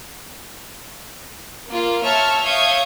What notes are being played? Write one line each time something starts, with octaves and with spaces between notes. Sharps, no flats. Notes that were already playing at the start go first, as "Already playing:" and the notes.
A#3 F4
C#5 E5 A5 F6
C#5 E5 F5 D#6 G6 G#6